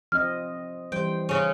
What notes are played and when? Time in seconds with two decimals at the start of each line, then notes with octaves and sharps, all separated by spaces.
0.12 F3 C4 D#5 F6
0.92 E3 G3 C5 G5
1.29 C#3 C#4